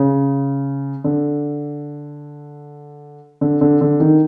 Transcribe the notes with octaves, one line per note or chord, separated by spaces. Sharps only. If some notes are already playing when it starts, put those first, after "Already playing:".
Already playing: C#3
D3
D3
D3
D3
D#3